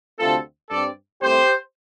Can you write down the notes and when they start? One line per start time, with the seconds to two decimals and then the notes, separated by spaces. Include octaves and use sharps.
0.19 D2 C3 A3 C4 F4 A4
0.70 G2 G3 C4 A4 D5
1.22 C2 C3 A3 G4 C5